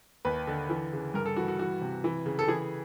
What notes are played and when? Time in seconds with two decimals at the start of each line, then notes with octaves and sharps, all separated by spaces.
0.25 D#2 B4
0.47 D3
0.69 E3
0.93 C#3
1.14 G2 A#4
1.26 A4
1.36 E3 F#4
1.48 F#4
1.59 E3 F#4
1.81 C3
2.04 E3
2.26 C#3
2.39 A4
2.48 E3 G#4